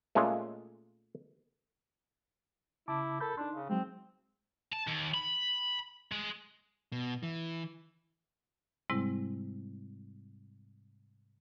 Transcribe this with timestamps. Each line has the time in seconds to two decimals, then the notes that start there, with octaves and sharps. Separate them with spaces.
0.15 A#2 G#3 A3 C#4 F4
2.88 C#3 E4 A5 D6
3.21 A4 A#4 B5 G6
3.37 D4 D#4 C6
3.55 C#3
3.70 F#3 G#3 C4
4.72 A5
4.87 D#2
5.14 B5
6.12 G#3
6.92 B2
7.23 E3
8.90 G#2 C3 G3 G#3 C4 E4